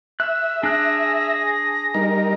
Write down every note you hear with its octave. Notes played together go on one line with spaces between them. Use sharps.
E5 F#6
D4 G#4 F#6 A#6
G3 D#4 A#4